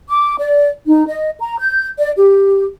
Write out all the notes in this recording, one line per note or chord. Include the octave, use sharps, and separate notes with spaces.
D6
D5
D#4
D#5
A#5
G6
D5
G4